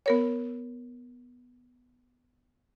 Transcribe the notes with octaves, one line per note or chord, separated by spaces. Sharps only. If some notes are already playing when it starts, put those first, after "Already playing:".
B3 A#4 C#5